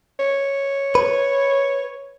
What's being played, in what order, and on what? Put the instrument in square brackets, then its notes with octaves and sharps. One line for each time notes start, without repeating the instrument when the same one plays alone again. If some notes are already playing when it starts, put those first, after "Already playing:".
[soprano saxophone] C#5
[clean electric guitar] B4